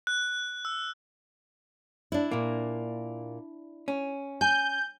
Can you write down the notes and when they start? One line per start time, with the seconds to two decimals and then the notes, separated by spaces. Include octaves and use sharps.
0.07 F#6
0.65 E6
2.12 D4 E4
2.31 A#2 A#3
3.88 C#4
4.41 G#5 G6